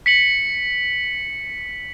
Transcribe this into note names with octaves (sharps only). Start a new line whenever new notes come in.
B6 C#7 F#7